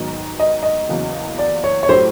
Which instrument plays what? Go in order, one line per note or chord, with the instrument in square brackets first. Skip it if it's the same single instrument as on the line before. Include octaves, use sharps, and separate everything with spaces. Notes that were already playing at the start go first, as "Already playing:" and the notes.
Already playing: [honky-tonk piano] G#2 D#3 F#3 B3 D#4
[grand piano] D#5
D#5
[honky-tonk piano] E2 C#3 F#3 A#3
[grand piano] D5
C#5
C#5
[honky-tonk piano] A2 F#3 A3 D4 G4 [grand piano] C5